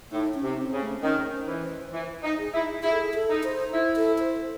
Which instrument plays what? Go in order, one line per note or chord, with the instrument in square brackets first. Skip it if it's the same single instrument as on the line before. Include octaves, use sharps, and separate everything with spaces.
[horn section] A2 [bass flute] D#4
[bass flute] C#4
[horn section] C3
[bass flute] C4
[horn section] C#3
[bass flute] A3
[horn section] D#3 [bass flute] C#4
[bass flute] C5
[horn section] E3
[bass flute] C5
[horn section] E3
D#4
[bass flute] G#4
[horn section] E4
[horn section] E4 [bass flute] G#4
[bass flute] A4
G#4
A4
[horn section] D#4
[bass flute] C5
[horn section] E4
[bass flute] A4
C5